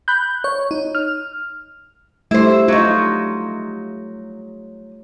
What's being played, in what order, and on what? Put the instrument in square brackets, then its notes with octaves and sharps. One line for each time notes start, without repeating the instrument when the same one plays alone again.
[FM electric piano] B5 F#6 G6
C#5
D#4
F6
[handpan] G3 A3 [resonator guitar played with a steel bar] E4 C5
[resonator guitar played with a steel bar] F#3 D#4 [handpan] F4